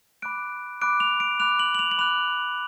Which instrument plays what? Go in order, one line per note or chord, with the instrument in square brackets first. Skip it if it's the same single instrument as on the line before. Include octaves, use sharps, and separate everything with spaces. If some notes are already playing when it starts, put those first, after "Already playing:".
[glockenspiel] B5 D6 F#6 D7
B5 D6 F#6 D7
F7
D7
B5 D6 F#6 F7
F#7
F#7
F7
F#7
B5 D6 F#6 F7